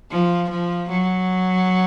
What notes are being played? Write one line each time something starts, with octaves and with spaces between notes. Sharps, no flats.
F3
F3
F#3